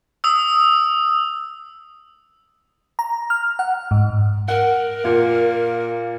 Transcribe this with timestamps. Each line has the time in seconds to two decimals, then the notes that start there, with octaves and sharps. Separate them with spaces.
0.24 D#6 E6
2.99 A#5
3.30 F6
3.59 F#5
3.91 G#2
4.48 A#4 F#5
5.05 A#2 A#3